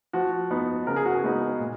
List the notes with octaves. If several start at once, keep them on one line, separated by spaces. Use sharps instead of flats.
F3 F#4
B3 D#4
C#3 A#4
G#4
F#4
G#4
G#3 B3 D#4
A#2